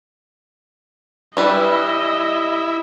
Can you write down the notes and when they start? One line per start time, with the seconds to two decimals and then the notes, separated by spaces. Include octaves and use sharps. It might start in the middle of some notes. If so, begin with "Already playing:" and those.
1.37 E3 G3 E4 B4 D#5